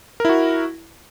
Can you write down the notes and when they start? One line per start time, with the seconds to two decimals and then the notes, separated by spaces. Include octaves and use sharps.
0.20 A#4
0.25 E4
0.29 F#4